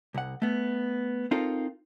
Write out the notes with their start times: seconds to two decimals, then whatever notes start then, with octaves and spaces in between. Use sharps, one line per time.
0.14 C2 F#5
0.42 A3 B3
1.31 C4 D#4 F4 A4 A#4